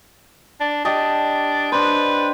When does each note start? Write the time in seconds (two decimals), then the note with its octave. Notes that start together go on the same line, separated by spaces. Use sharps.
0.60 D4
0.85 D4 G4 D#5 A5
1.72 D4 B4 C5